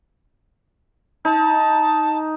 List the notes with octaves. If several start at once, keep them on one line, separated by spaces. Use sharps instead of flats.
D#4 A5